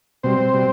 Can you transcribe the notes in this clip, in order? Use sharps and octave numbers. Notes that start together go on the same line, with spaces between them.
B2 G3 C4 C5
B2 G3